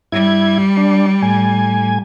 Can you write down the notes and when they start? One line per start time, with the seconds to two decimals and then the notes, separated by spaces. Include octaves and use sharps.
0.12 G2 G3 E4 G#6
0.77 D4
1.22 A2 G#5